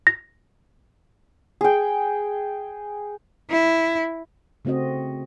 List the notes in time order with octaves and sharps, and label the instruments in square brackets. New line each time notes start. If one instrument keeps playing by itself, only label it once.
[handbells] A#6
[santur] G#4 G5
[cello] E4
[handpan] C#3 A3 C4 F#4 D#5